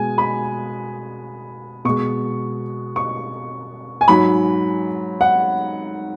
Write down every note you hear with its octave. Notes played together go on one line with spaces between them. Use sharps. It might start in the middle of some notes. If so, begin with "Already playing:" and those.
Already playing: B2 G#3 G#5
B5
B2 G#3 C#6
C#6
G#5
G#2 F#3 B5
F#5